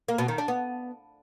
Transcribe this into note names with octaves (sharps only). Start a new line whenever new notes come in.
A#3
B2
D#3
D4
B3